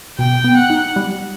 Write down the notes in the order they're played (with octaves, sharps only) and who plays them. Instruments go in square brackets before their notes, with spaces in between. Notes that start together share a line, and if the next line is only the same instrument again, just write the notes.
[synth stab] B2 [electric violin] G5
[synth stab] B3
[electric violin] F#5
[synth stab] D#4
G3